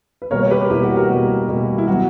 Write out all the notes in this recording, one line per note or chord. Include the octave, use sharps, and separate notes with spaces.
B4
B2 G3 A#3 A#4 C#5
C#5
G4 B4
B2 G3 A#3 E4 G4
F#4
F#4 A#4
B2 G3 A#3
B2 G3 A#3
E4
F#3 B3 F#4